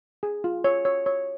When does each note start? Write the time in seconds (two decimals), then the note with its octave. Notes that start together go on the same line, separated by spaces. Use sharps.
0.23 G#4
0.44 F4
0.64 C#5
0.85 C#5
1.06 C#5